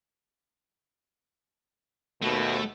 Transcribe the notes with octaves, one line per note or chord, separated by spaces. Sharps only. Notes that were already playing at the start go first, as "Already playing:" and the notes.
D#2 B2 A3